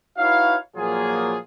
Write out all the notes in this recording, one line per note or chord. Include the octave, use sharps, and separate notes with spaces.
D#4 E4 F#4 B4 C#5 F5
A#2 F3 F#3 A#3 F4 G#4